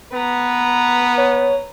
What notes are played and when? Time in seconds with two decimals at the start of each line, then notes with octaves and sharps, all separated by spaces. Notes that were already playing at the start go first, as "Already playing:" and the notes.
0.13 B3 B4 A#5
1.18 C#5